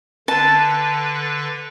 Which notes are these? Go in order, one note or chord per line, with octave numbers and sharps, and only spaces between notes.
D3 B4 A5